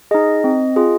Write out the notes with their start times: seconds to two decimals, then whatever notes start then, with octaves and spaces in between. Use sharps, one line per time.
0.11 D#4 G#4 D#5
0.44 C4
0.76 F4 G#4